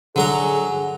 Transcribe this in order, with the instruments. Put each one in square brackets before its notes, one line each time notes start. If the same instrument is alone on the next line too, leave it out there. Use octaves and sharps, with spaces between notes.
[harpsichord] D3 F#3 A#5 [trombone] G#4